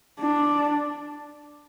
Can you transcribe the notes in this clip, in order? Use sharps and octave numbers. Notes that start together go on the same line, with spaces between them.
D4